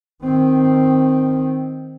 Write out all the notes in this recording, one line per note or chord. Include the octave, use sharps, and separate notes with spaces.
D#3 C4